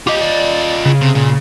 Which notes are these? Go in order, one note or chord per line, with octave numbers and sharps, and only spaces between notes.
F4 G4 D#5
D5
C#3
C3
A#2